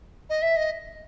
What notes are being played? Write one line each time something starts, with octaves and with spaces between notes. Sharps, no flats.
D#5
E5
D#5